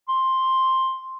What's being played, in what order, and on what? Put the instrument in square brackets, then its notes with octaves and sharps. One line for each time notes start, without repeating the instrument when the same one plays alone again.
[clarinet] C6